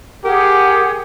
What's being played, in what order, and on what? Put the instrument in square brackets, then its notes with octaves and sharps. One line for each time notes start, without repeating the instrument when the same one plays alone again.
[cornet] G4 [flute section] G#4 F#5 [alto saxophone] A#4